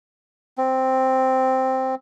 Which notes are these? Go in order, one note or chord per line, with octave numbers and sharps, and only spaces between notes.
C4